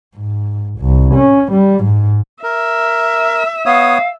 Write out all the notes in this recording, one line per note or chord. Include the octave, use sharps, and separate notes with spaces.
G#2
C2
C#4
G3
G#2
A#4 E5
B3 C#5 F5 D#6